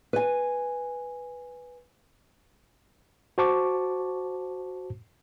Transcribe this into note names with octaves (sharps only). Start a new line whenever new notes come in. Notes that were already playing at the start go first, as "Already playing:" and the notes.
B4 G#5
F#4 C5 A5 C#6 D6